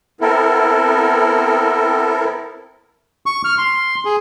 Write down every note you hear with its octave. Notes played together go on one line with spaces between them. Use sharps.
B3 C4 E4 A4 A#4
C#6
F6
C6
G#4